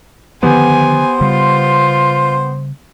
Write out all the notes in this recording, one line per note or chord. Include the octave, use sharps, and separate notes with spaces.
D3 D#3 F3 B3 G4 C5 G#5
C#3 G3 F4